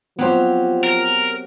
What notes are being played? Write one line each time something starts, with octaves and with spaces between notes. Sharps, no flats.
F3 F#3 B3 C4 G4 C5
A#4